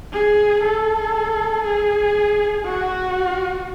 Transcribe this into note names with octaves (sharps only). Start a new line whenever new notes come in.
G#4
A4
G#4
F#4